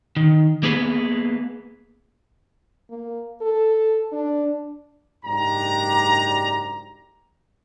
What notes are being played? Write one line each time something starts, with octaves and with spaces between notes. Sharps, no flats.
D#3
A#3 B3 G#4 B4
A#3
A4
D4
F#1 G#2 D4 G4 A#5